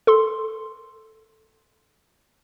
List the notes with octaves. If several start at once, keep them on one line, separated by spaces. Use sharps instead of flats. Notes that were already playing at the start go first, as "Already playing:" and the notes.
A4 C6